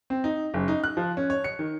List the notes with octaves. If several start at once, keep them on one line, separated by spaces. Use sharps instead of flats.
C4
D#4
F#1
D#4
F#6
F3
C#4
C#5
C#7
D#3